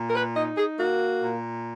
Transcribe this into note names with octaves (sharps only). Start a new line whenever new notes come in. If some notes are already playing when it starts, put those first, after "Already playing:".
Already playing: A#2
A#4
B4
D#4 D#5
G#4
A#3 F#4
A#2